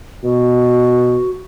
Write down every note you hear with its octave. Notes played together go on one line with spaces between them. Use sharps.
B2 F#4